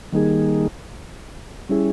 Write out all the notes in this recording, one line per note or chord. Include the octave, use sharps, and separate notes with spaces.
D#3 G3 A#3 D#4 G#4
G3 C#4 E4 G#4